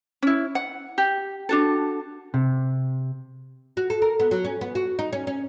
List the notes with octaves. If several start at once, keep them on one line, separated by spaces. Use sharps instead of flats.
C#4 E4
F#5
G4
D4 F#4 A4
C3
F#4
A4
A#4
B3
F#3
C#4
B3
F#4
D#4
C#4
C#4